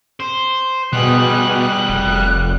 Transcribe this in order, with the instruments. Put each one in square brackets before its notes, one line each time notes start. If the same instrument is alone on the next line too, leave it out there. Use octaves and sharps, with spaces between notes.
[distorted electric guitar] C5
[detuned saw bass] B2 [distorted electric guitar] G3 G#4 [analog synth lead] F#6
[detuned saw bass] F1